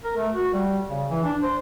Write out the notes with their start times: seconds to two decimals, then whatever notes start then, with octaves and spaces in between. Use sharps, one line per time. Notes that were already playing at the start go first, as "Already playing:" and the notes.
0.04 A#4
0.17 A3
0.34 F#4
0.53 G3
0.89 C#3
1.11 E3
1.24 D4
1.43 C5